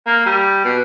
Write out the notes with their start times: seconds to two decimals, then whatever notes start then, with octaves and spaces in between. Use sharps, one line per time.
0.07 A#3
0.26 G3
0.65 B2